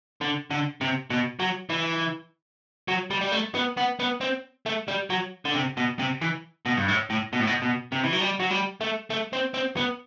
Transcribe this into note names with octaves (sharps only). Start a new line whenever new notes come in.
D3
D3
C3
B2
F#3
E3
F#3
G3
G3
A3
B3
B3
B3
C4
A3
G3
F#3
D3
C3
B2
C3
E3
B2
G2
A2
A2
B2
A2
B2
B2
C3
E3
F#3
G3
F#3
G3
A3
A3
C4
C4
B3